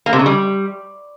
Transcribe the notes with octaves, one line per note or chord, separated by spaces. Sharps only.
A#3
C3
C#3
G3